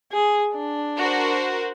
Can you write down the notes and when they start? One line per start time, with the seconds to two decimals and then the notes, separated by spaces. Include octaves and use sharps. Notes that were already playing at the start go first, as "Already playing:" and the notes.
0.13 G#4
0.56 D4
0.99 F#4 A#4 C5